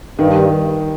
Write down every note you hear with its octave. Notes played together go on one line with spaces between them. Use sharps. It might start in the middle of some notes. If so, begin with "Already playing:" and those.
G2 D#3